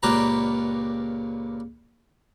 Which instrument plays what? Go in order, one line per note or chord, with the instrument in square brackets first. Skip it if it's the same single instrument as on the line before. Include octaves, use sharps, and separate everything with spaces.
[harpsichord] C#2 A#2 D4 G4 B4 A#5